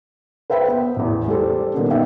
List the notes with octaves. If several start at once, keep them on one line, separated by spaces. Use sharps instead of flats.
B4 C5 E5 G5 B5
B3
A1 E2
G3 A4 C5
A#2 D#3 B3 C#4
B3 D#4 E5 G5